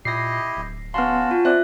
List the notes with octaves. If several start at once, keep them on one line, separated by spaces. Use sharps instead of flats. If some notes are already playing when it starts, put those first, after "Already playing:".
A#2 E4 G4 D#5 A#6 C7
D1
B3 C#4 F#4 F5 A5 C6 F6
F4
C4 C5 D5 E5 F#6